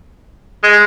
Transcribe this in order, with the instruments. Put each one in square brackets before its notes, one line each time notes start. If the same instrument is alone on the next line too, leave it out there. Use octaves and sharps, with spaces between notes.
[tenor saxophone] G#3